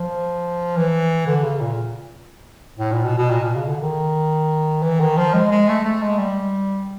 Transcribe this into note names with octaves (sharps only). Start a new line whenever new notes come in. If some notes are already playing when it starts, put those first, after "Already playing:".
Already playing: F3
E3
D3
C#3
A#2
A2
A#2
B2
B2
A#2
B2
C#3
D3
D#3
E3
D#3
F3
G#3
G#3
A3
A3
G#3
G3